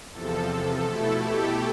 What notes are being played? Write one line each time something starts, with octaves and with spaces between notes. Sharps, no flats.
E2 C3 F3 A4
B2 A3 E4 A4
G4